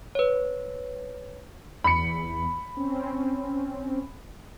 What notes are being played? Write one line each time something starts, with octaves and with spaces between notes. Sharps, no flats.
B4 C#5
E2 B5 C#7
C4 C#4